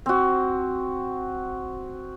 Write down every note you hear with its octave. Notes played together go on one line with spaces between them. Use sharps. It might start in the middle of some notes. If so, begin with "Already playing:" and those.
C4 F#4